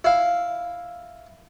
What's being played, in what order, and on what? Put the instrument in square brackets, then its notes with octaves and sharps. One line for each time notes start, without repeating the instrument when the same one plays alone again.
[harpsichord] E4 F5